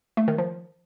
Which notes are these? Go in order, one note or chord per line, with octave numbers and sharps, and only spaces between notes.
A3
D#3
F3